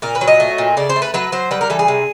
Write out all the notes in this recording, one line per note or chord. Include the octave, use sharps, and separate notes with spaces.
A#2 A#4
B4
F#3
D#5
A3
A#2
C#3 D5
C5
A3
B4
F#3 B4
F#3 C5
G3 B4
A#4
E3 A4
G#4
C3